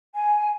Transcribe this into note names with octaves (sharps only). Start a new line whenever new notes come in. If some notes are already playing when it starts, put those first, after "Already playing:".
G#5